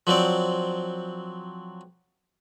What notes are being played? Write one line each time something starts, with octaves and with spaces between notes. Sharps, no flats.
F3 F#3 C4 D5